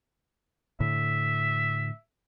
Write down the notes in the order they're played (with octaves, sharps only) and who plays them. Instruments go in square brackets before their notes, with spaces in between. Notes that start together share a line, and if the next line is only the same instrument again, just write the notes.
[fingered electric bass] A2 D3 [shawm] E5